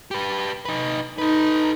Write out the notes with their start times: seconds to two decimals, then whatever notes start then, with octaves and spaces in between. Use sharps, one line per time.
0.11 G4 B4
0.65 D#4 B4
1.19 D#4 A4 B4